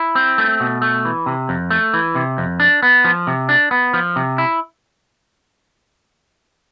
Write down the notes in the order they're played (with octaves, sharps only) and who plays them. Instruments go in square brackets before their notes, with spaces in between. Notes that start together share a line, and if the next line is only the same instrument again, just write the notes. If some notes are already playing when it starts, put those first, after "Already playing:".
Already playing: [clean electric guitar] E4
C4
A3
B2
A3
E3
C3
F2
A3
E3
C3
F2
D4
B3
F3
C3
D4
B3
F3
C3
E4